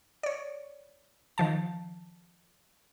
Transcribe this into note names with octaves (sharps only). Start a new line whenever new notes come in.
C#5 D5
D#3 F3 A5